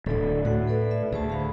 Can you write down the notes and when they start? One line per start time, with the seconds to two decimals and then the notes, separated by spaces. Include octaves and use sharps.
0.06 D1 D3 A4 D5
0.45 A2 F#4 F#5
0.67 A4 B4 D5
0.91 E5
1.12 D2 G#4 C5 A5
1.30 G#4 F5 B5